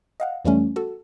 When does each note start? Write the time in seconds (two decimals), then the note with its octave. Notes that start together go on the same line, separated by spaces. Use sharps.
0.20 D#5 F5 F#5
0.45 F2 E3 G3 A3 C#4
0.76 F#4 A4